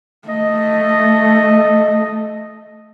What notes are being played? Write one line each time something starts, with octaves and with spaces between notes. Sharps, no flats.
A3 D#5